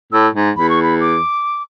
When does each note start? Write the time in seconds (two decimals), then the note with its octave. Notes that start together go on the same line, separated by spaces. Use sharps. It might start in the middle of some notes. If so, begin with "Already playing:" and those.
0.12 A2 E6
0.35 G#2
0.57 E2 B5
0.70 C#6
0.83 B5
1.01 D6